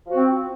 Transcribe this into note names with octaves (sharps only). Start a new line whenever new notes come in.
F3 C4 F#4